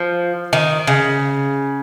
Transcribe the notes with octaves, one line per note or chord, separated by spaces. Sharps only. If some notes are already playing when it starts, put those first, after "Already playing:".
Already playing: F3
D#3
C#3